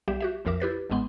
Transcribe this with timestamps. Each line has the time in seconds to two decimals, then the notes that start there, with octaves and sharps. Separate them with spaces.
0.08 B1 G3 G4 E5
0.20 F#4 G4 E5
0.45 A#1 F2 F3 A#4 E5 D6
0.60 E4 G4 B4 A6
0.90 G1 G#2 G#3 B3 C6